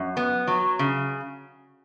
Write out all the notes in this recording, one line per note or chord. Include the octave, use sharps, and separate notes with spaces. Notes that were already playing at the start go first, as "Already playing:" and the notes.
Already playing: F#2
B3
F#3
C#3